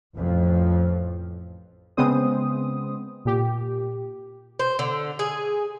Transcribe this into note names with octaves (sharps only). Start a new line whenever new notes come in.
A1 F2 F3
C#3 G#3 B3 C4 C5 D#6
A#2 G4
C5
D3
G#4